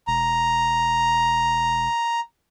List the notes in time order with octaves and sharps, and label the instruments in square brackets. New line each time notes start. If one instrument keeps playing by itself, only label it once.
[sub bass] E1 [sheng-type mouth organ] A#5